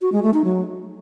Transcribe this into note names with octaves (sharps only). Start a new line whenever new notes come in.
F#4
G#3
A3
D#4
F#3